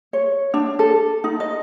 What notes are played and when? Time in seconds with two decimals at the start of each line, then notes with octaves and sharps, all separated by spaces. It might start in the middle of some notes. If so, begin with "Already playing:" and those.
0.13 C#5
0.54 D4
0.79 A4
1.24 D#4
1.40 D#5